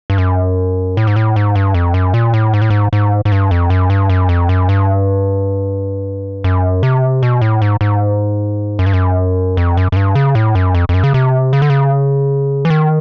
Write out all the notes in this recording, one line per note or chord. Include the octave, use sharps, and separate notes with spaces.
G2
F#2
A2
G#2
A2
G#2
G2
F2
F#2
A#2
A2
G#2
A2
G#2
G#2
G#2
G2
F2
F#2
G2
F#2
F2
F#2
G2
F#2
C3
B2
A2
G#2
G#2
F#2
G2
F#2
F2
F#2
F#2
G2
C#3
A2
F#2
F2
F2
F#2
C#3
C3
C#3
D3
C#3
E3
D#3